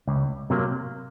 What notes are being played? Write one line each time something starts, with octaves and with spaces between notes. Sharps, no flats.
C#2
C3 F#3 A#3